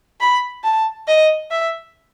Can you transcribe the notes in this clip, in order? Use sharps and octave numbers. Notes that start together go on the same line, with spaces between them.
B5
A5
D#5
E5